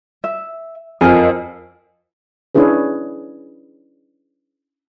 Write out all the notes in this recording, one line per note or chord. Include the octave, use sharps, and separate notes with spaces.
E5
F2 A#4 D#5 G#5
C#4 D4 E4 G#4 B4